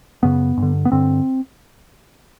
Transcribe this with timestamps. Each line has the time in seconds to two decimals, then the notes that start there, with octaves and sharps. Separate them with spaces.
0.23 F#2 C#3 B3
0.57 G2
0.62 D3
0.85 B3
0.92 G2 D3 C4